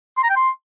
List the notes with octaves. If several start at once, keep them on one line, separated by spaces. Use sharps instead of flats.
C6
A#5
G5
C6